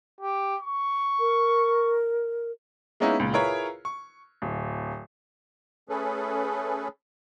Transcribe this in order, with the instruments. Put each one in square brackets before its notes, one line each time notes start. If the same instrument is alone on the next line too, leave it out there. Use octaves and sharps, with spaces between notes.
[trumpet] G4
C#6
[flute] A#4
[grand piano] G#3 A#3 B3 C#4 D#4 E4
C#2 A#2
E4 F4 G#4 A#4 B4 C#5
C#6
D1
[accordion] A3 C#4 G#4 A4 B4